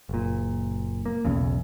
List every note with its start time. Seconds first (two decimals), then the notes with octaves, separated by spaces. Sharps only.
0.09 F#1 A#2
1.06 A#3
1.25 B1 E2 C#3